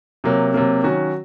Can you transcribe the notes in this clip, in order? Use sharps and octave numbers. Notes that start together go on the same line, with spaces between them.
C3 F#3 A#3
C3 F#3 A#3
D#3 F#3 C#4 F#4